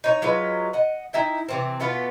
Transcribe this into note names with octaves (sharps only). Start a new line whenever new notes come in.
D#4 C#5
F#3 G#3 F4 B4
D#5 F#5
D#4 E4 E5 G5
C3 E3 C4
B2 A3 B3 F4